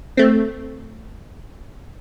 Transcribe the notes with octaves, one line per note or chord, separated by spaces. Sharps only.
A3 C4